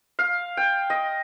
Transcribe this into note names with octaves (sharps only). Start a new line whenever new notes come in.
F5
G5
D#5